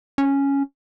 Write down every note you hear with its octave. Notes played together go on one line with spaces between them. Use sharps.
C#4